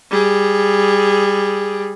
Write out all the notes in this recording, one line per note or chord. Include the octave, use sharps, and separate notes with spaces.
G3 G#4